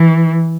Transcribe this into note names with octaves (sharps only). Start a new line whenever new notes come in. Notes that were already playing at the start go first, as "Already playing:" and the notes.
Already playing: E3